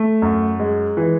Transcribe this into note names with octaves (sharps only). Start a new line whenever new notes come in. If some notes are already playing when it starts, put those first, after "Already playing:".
Already playing: A3
F#2
G#3
E3